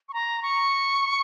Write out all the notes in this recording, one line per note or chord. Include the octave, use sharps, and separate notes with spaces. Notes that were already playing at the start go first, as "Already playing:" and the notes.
C#6
A#5
C#6